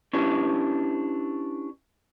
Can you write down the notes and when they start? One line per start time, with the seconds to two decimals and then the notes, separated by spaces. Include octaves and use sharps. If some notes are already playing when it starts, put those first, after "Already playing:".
0.13 C#4 D4 E4 G4 B4